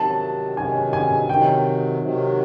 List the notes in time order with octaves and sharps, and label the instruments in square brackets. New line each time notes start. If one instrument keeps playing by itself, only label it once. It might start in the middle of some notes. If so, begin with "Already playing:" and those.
Already playing: [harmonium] C3 D#3 F#3 [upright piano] A5
[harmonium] C3 D#3 F#3 [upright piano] G#5
[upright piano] G#5
[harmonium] C3 D#3 F#3 [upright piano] G5
[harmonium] C3 D#3 F#3